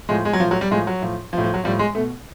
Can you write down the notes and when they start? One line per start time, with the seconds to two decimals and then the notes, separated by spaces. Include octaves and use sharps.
0.09 A2 F3 G#3
0.25 G#3
0.33 F#3
0.40 F3
0.45 A2
0.51 F#3
0.61 G3
0.71 A2 F3 G#3
0.87 F#3
1.02 A2 F3
1.33 F3
1.38 A2
1.44 F3
1.54 F#3
1.64 A2 F3 G3
1.79 G#3
1.95 B2 A3